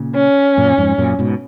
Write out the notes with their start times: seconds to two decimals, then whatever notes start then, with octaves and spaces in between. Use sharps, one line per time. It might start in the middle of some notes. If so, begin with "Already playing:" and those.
Already playing: A#2 C#3
0.16 C#4
0.57 F#2 A#2
0.78 F2 G#2
0.98 F#2 A#2
1.19 G#2 B2